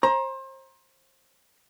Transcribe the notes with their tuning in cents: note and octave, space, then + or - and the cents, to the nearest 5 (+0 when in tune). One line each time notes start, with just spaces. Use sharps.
C5 +30 A#5 +25